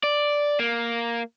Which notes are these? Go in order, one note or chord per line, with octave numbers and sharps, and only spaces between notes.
D5
A#3